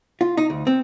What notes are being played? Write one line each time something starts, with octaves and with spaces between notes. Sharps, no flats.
F4
D#4
D2
C4